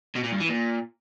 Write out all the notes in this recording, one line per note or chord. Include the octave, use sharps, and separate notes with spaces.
B2
A#2
G2
E3
A#2